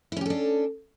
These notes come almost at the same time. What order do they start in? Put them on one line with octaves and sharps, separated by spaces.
E4 C#4 G4 A4 D4